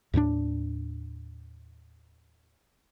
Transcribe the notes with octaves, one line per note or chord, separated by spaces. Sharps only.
D#2 A2 G3 D4